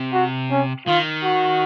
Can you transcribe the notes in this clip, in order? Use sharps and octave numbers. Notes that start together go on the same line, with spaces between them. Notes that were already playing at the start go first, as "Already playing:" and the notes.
Already playing: C3
F#4
C#4
D#3 F4
F#4